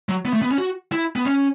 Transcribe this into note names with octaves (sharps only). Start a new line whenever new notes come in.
F#3
B3
A3
B3
C#4
F#4
E4
B3
C#4